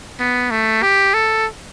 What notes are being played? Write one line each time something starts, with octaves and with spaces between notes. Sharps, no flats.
B3
A3
G4
A4